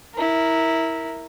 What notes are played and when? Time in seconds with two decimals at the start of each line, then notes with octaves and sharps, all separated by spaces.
0.14 E4 A#4